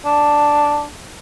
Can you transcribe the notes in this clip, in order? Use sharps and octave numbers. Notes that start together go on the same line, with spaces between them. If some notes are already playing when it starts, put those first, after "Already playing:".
D4